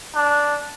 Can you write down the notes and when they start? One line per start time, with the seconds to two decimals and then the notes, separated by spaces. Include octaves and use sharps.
0.15 D4